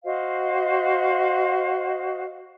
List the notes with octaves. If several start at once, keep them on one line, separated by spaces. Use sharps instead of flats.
F#4 C5 D#5 F5